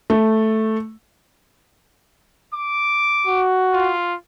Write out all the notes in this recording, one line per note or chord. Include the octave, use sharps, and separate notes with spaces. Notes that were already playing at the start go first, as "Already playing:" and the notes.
A3
D6
F#4
F4